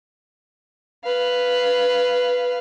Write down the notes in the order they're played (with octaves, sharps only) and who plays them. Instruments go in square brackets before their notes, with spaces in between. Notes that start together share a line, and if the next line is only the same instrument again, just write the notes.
[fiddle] B4 F5